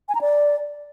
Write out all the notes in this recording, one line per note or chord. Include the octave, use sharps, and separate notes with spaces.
G#5
A#5
D5